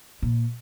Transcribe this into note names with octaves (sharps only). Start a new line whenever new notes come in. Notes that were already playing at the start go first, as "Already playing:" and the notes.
A#2